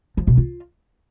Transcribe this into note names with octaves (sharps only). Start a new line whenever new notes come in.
F3
B2
F4